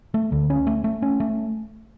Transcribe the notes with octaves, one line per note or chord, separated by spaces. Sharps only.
A3
D2
C#4
A3
A3
C#4
A3